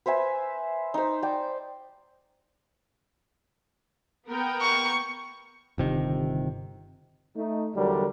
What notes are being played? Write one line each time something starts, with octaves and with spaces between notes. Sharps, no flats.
B4 C5 E5 G#5
D#4 C5
D5 G5
B3 A#4 G5
C#6
G1 C3 D#3
A3 D#4
E2 D3 F#3 G3 D4 A#4